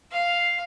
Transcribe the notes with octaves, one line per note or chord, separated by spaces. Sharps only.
F5